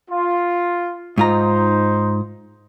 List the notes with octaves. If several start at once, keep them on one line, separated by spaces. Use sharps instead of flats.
F4
G#2 D#4 F4 C5 A#5